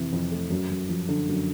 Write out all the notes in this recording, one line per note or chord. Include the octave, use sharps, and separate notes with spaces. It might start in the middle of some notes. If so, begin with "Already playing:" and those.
Already playing: F2 C3 E3
F2
A3
F#2
F#2
F3
D3
F#2